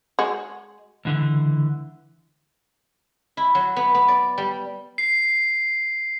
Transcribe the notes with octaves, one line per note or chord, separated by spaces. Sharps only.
G#3 F#4
C#2 D3 E3
E4
F#3
B3
B3
D5
G3
C7